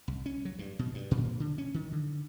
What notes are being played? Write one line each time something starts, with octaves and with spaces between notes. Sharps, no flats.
C2
C#4
F#3
G2
B2
G2
A#2
D3
C#4
D#3
D3